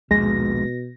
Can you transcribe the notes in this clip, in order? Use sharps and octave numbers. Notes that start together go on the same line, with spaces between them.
A#1 D#2 G#2 B2 G#3 A#6